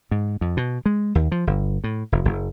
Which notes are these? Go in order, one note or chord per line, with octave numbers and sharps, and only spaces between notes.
G#2
F2
B2
G#3
D#2
F3
G1
A2
F1
F#1